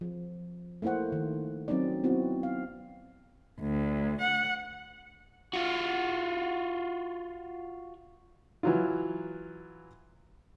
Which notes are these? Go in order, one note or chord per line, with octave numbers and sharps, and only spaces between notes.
F3
A3 A#3 E4 C5 F#5
D#3
F#3 C4 C#4 D#4 D5
B3 C4 E4 F#4
F5
D2
F#5
F4 F#4
E3 F#3 F4